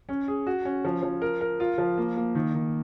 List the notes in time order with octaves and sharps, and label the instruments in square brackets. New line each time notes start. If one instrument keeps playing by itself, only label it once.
[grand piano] C#4
G#4
F#4
C#4
F3
F3
A#4
A#4
F4
F3
A#3
A#3
D#3
D#3